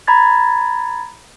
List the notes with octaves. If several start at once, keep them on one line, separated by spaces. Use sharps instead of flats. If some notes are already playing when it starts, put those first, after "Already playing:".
A#5 B5 G#6 A6